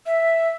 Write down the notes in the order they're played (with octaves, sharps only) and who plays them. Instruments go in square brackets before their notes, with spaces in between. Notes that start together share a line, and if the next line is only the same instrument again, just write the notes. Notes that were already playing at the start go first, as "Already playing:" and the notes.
[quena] E5